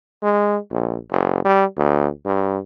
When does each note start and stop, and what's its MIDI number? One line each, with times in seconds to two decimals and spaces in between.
0.23 0.57 56
0.71 0.96 34
1.10 1.42 30
1.45 1.64 55
1.77 2.07 38
2.26 2.58 43